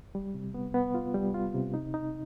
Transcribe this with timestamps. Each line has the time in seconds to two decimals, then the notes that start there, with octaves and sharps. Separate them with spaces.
0.15 G3
0.34 C3
0.54 B3
0.74 B3
0.94 F4
1.14 G3
1.34 F4
1.54 C3
1.74 D#4
1.94 D#4